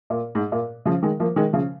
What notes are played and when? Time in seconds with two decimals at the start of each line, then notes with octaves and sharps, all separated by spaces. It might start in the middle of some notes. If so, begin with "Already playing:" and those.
0.10 A#2
0.35 G#2
0.52 A#2
0.85 C#3 F3
1.03 D#3 G#3
1.20 F3 A#3
1.36 D#3 G#3
1.53 C#3 F3